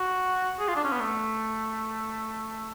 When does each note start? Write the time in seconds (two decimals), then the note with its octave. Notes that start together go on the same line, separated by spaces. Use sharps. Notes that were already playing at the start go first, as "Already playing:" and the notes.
Already playing: F#4
0.59 G#4
0.68 F4
0.76 D4
0.84 C#4
0.92 B3
1.00 A3